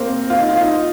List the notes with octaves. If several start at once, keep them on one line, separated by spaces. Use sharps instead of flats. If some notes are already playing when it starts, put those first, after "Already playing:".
Already playing: A#3 C4
F4
D#4
F4
D#4